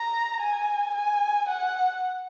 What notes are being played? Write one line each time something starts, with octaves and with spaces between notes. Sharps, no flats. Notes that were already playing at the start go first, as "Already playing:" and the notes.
Already playing: A#5
G#5
G#5
F#5